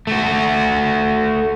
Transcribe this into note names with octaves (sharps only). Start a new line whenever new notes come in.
A3 F#4